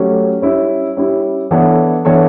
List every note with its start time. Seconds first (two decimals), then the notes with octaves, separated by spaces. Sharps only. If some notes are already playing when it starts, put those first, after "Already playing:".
Already playing: F#3 A3 C#4 G4
0.42 G3 C#4 E4
0.97 G3 C#4 E4
1.51 E3 B3 D4 A4 C#5
2.05 E3 B3 D4 A4 C#5